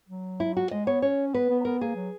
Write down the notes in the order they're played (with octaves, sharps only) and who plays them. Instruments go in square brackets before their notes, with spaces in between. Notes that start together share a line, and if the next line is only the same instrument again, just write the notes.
[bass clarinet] F#3
[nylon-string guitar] E4
F#4
[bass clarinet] G#3 [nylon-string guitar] D#5
[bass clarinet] B3 [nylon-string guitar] C#5
[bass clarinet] C#4 [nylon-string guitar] C#5
[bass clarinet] B3 [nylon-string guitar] B4
[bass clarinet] B3
[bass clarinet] B3 [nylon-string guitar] A#4
[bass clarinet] A#3 [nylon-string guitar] G#4
[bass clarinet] F#3